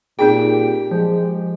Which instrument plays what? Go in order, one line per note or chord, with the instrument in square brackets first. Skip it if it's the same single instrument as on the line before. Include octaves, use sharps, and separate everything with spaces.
[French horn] A#2 [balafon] C4 D#4 G#4 [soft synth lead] G4 [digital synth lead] G5
[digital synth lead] F3 [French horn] G#3